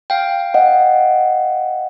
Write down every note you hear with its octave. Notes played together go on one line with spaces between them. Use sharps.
F5 G5
D#5 F#5